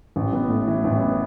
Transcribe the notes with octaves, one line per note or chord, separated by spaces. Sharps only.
A1
B3
A2
E3
A1
B3